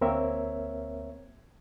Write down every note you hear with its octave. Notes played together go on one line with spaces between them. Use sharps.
D2 A#3 C4 A#4 C#5 E5